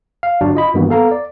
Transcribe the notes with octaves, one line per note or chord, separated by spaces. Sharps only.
F5
G1 F#3 D4 F#4
F4 D#5 B5
G2 D#3 E3 A#3 B3 F#4
B3 A4 F5 A#5
D5